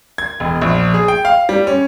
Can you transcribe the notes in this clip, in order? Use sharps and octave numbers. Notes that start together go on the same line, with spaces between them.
G#6
E1
A#1
G#4
G5
F5
G3
C#4